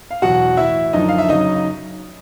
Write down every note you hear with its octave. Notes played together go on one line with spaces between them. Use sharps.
F5
E2 B2 F#3 F#4 F#5
A2 E3 E4 E5
F#2 D3 F3 D#4 D#5
F5
E5
F#2 C#3 F#3 D#4 D#5